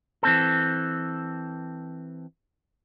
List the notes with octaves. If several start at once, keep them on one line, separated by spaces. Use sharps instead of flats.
E3 C4 A4